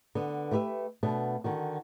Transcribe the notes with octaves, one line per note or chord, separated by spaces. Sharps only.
D3 B3
A3 E4 G4 B4 E5
B2 A3 B3 D4
D3 D#3 F#4